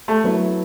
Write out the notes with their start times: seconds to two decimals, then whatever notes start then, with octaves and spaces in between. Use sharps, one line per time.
0.08 A3
0.24 F#3 B3 E4